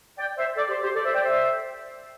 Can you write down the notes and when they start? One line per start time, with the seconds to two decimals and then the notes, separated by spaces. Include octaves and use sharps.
0.18 D5 G5
0.37 C5 E5
0.57 A4 D5
0.69 G4 C5
0.83 G4 C5
0.95 A4 D5
1.04 C5 E5
1.14 D5 G5
1.23 C5 E5